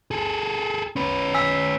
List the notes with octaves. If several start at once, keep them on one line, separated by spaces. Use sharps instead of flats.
G#4 A4
C#4 B4
G#5 E6 B6